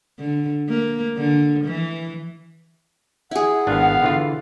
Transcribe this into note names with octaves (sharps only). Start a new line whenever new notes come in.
D3
A#3
D3
E3
E4 G#4 F#5
G#1 B3 D4 B4 F5
D3 E3 F4